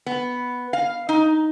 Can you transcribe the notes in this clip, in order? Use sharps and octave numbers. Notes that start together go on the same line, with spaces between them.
B3
F5
D#4